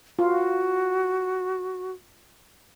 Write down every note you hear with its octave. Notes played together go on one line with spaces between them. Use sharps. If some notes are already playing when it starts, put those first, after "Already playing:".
F4 F#4